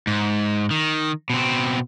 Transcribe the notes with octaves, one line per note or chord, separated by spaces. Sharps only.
G#2
D#3
B2 C4